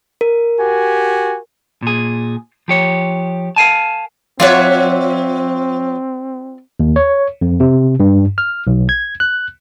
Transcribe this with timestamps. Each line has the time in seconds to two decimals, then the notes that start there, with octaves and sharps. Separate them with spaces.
0.21 A#4
0.60 F#4 G4 G#5
1.83 A#2 G#4
2.68 F3 G4 C#5
3.56 A#4 F5 G#5 A5
4.40 F3 C4 F4 C#5 D5 E5 F#5
6.80 D#2
6.96 C#5
7.41 F2
7.60 C3
8.00 G2
8.38 F6
8.67 B1
8.89 G#6
9.20 F#6